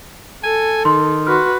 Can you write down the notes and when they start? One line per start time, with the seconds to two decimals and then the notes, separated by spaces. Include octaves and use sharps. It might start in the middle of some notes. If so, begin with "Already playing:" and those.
0.44 A4 G#5
0.85 D#3 C6
1.27 F#4 B4 C6 F6